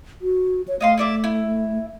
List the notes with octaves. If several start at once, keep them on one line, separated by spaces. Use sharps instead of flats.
F#4
C#5
A3 D#5 F5 C6
E4 D5 E5
E4